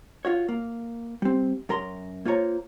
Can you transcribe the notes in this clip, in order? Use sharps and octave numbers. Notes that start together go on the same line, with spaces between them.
F4 F#4 C#5
A#3
G3 C4
F#2 A#4 A#5 C6
A#3 F4 C5 C#5 A#5